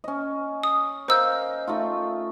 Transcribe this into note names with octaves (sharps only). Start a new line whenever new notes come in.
C#4 D#5
D#6
A#4 C5 D#5 F5 E6 G6
A3 D#4 F4